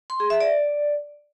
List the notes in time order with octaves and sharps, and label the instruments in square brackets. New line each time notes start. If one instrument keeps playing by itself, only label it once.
[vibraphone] C6
G#4
E5
D5